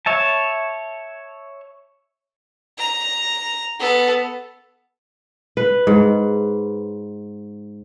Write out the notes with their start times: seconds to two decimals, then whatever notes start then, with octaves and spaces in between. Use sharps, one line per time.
0.06 C#5 E5 A5
2.78 A#5
3.80 B3 A4
5.57 B4
5.87 G#2